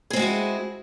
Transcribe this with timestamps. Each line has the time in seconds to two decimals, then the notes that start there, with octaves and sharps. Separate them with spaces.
0.10 G#4
0.13 C4
0.16 G#3
0.19 F#4
0.22 E4